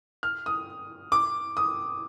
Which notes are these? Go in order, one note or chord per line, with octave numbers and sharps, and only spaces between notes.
F6
D#6
D6
D#6